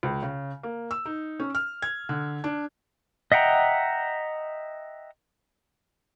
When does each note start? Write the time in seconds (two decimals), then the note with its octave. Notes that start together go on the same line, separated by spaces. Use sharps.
0.03 C#2
0.23 C#3
0.63 A#3
0.91 E6
1.06 D#4
1.40 C#4
1.55 F6
1.82 G#6
2.09 D3
2.44 D4
3.32 D#5 E5 F#5 G5 A#5